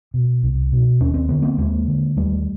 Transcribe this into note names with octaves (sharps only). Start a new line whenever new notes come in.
B2
C2
B2
D#2 C#4
C4
D3 B3
A#3 C4
D#2 G#3 A#3
D3
D#2 G3 A3